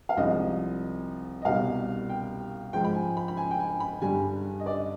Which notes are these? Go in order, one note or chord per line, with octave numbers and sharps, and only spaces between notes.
F5
C2 C3 F3 G#3 D#5
D#5
C2 B2 G3 F5
G5
G#2 F3 G#3 G5
B5
G#5
B5
B5
G#5
G5
G#5
B5
G2 D3 G3 G#5
D#5
D5